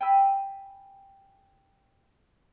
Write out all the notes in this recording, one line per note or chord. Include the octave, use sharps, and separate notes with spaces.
G5 G#5 B5 E6